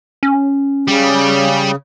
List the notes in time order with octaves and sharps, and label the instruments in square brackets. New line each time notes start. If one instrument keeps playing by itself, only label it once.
[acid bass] C#4
[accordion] C#3 [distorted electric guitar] G3